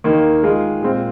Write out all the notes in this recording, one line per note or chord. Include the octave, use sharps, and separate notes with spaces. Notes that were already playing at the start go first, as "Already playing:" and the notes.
D#2 D#3 A#3 D#4
D#3 G#3 F4 G#4
A#2 G#3 C4 F4